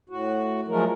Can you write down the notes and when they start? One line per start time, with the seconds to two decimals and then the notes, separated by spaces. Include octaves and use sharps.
0.10 A2 F#4
0.68 F3 F#3 G#3 A3 A#4